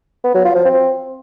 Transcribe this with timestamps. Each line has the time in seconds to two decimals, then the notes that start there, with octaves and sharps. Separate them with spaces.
0.24 B3
0.34 F#3
0.45 F4
0.55 F3
0.65 C4